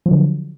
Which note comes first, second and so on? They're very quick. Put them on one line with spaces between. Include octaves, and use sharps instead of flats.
F3 F#3 D3